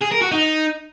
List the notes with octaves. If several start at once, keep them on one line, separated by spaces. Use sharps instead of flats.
G#4
A#4
F#4
D#4